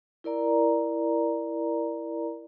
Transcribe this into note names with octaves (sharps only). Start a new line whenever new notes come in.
E4 A#4 D5 A#5